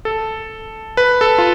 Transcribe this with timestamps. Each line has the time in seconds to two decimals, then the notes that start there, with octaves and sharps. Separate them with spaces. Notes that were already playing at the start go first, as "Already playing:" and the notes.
0.05 A4
0.97 B4
1.21 A4
1.38 F4